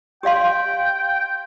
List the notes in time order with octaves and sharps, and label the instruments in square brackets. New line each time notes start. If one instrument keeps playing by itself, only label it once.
[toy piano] G4 D5 F5 C6 [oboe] G5